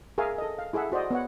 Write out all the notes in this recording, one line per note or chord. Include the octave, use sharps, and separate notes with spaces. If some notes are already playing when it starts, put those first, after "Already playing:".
G#4 A#4 E5 F5 G#5
A4 D#5
F5
E4 G#4 A4 E5 F#5
F#4 C5 D5 D#5
B3 C#5 F#5